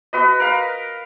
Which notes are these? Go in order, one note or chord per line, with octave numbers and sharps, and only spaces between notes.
F#4 B4 D#5
A#4 B4 F5